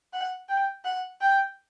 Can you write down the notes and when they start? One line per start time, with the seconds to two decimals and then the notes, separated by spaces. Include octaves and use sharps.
0.13 F#5
0.49 G5
0.85 F#5
1.21 G5